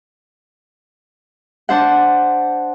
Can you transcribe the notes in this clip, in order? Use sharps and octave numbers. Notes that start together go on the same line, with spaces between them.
D4 C5 F#5